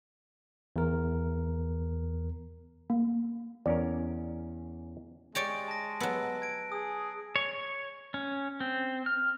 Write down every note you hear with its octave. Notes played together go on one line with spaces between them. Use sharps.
E2 A#4
A#3
E2 C#4 A#4 D5
G#3 G4 C#5 D5 A#6 D7
A5 A#6
F#3 B3 A#5 E6 F#6
G#6 D7
G#4 D#6
C#5
C#4
C4
F6